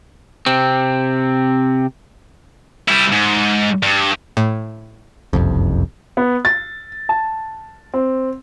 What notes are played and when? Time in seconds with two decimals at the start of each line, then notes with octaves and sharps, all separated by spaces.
0.46 C3 C4
2.88 G3 E4
3.13 G#2
3.83 G2
4.37 A2
5.33 F#1 C2 F2
6.17 B3
6.45 A6
7.09 A5
7.94 C4